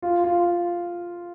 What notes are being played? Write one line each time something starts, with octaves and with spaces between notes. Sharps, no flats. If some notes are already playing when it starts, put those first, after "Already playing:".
F4
F4